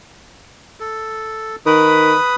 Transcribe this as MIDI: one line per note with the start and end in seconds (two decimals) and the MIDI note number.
0.80 1.56 69
1.66 2.14 51
1.66 2.36 71
1.66 2.36 83
1.66 2.36 87